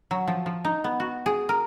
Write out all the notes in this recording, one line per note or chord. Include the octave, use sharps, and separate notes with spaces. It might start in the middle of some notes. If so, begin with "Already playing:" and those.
F#3
F3
F3
D#4
B3
F#4
G#4
A#4